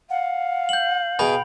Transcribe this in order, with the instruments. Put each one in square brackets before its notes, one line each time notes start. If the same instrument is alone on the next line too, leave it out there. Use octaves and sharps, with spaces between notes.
[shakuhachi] F5 [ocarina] F#5
[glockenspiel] G6 F#7
[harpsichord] B2 G#4 [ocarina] G5 [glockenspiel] B5